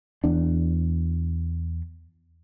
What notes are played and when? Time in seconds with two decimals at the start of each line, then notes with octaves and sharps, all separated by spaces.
0.24 E2 D4